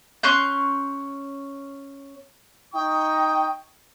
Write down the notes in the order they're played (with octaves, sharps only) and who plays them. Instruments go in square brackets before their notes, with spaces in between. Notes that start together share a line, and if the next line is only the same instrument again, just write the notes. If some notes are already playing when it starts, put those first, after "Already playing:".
[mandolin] C#4 C6 F#6 G6
[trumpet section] D#4 C#6 D#6 [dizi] G5